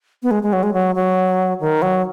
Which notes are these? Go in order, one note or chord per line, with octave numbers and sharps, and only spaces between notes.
B3
G#3
G#3
F#3
G#3
F#3
F#3
D#3
F#3